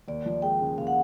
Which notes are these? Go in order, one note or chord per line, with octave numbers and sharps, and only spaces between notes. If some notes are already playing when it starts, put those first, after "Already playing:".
D#2 D5
F3
G#3 G5
C#3
D#2 F5
F#5